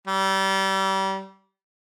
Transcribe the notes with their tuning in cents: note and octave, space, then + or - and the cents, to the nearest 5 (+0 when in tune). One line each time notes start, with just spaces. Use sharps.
G3 -30